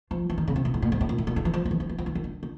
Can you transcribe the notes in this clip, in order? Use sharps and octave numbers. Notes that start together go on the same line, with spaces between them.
F3
E3
D#3
C#3
C3
B2
A2
A#2
G#2
A2
A#2
A2
A#2
D3
E3
F3
D#3
E3
F3
E3
F3
E3
D#3
D3
D3